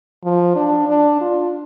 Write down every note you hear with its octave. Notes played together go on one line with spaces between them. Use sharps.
F3
D4
D4
F4